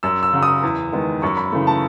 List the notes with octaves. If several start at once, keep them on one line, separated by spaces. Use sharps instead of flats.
F#2 E6
E6
C#3 F#3
D#6
E2
D#3 G#3 B3
F#2 C#6
B5
C#3 E3 A3
A5